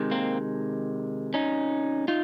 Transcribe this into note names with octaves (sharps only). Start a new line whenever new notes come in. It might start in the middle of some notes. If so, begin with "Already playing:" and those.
Already playing: C3 D#3 G#3
A#3 C4
C#4 D#4
D#4 F4